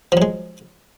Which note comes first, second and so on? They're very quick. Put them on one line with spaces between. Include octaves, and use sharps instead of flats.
F3 F#3 G#3